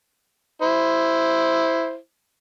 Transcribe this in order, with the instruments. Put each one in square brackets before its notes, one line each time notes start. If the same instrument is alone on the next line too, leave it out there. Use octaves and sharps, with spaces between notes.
[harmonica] E4 C5